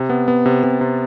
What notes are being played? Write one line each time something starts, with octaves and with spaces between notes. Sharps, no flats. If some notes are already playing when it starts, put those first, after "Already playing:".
Already playing: C3
B3
B3
C3
C3
C3